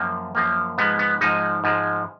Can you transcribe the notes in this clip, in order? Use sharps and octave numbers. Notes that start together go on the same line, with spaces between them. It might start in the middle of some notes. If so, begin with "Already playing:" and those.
Already playing: F#2 F3 A#3
F#2 F3 A#3
G#2 F3 G#3 B3
B3
G#2 F3 G#3 D#4
G#2 F3 G#3